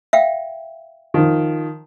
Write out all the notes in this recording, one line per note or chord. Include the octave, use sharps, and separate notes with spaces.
E5 F5 G5
D#3 F3